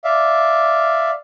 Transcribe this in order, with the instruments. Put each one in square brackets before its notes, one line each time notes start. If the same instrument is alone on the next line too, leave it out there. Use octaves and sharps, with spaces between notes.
[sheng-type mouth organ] D5 E5 F5